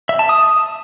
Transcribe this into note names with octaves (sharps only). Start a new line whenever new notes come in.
E5
A5
D#6